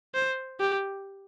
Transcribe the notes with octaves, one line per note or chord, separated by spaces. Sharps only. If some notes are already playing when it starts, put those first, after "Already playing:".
C5
G4